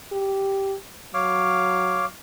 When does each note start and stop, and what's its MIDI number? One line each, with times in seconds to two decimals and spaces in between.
0.12 0.74 67
1.14 2.10 54
1.14 2.05 73
1.14 2.05 77
1.14 2.05 86